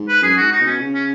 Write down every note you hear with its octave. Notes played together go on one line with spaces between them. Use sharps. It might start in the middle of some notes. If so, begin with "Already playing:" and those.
Already playing: G#2
B4
F#2 G#4
G#2 F#4
D#4
B2
C#4
C#3
C#4